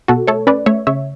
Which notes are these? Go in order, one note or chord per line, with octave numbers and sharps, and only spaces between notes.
B2 F#4 A4
A3 A4 C#5
C#4 B4 D5
A3 C#5 E5
C#3 C#5 E5